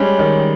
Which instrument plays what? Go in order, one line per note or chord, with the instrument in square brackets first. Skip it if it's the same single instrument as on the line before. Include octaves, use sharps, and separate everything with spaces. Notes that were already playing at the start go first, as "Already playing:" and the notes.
Already playing: [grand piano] G3 G#3 [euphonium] C#4
[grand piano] D#3